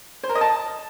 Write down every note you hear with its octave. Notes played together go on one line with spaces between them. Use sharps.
C5
A#4
D#5
A5